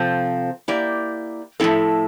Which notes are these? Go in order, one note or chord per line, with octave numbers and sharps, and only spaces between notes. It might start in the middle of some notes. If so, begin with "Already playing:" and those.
Already playing: C3 F3 C4 F4 A4
A#3 E4 G4 D5
A2 F3 C4 E4 A4